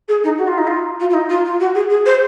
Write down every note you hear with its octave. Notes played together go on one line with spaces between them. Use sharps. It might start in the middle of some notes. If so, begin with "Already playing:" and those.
G#4
D#4
F#4
F4
D#4
F4
F4
F4
D#4
F4
F4
F#4
G#4
G#4
C5